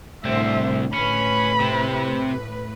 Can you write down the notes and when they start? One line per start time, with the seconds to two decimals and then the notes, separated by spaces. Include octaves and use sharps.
0.25 C2 A2 D3 C4 C5 E5
0.94 A2 C#4 B4 B5
1.60 C3 C4